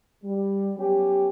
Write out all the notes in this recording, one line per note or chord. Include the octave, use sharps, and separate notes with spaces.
G3
F#3 B3 C#4 G4